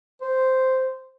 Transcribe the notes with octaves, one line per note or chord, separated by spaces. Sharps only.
C5